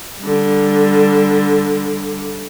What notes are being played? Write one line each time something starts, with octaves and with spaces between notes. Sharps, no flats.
D3 G3